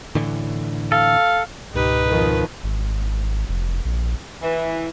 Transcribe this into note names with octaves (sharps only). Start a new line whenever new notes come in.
A2 D3 E3
A4 F5
C#2 G#2 B2 D#4 G4 B4
F2 D#3 F3
G#1
F1
A#1
E3